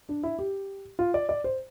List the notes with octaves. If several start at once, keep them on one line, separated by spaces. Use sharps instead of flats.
D4
E4
G4
F4
D5
D5
C5